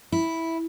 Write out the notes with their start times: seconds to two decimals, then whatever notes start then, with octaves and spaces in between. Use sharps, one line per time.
0.12 E4